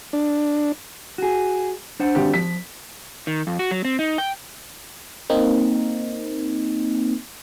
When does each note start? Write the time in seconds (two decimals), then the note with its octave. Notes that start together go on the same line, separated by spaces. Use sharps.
0.13 D4
1.18 F#4 G#4
2.00 D4 C5 F#5
2.15 G#1 G4
2.34 F3 B6
3.27 D#3
3.47 F2
3.59 F#4
3.71 F#3
3.85 C4
3.99 D#4
4.18 G5
5.30 A#3 C4 D#4